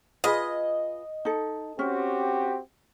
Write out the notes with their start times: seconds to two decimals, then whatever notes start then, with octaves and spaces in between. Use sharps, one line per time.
0.24 F4 G#4 B4 D#5
1.25 D#4 A4
1.79 C4 C#4 F#4 G4